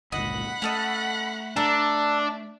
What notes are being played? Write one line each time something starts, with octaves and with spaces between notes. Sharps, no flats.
G1 C#2 A#2 D#5 F#5 B5
A3 C#4 A4 D#5
D4 A4 A#5